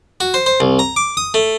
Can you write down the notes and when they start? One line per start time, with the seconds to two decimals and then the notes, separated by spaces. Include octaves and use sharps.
0.20 F#4
0.34 C5
0.46 C5
0.60 C2
0.79 A#5
0.96 D6
1.17 D#6
1.34 A3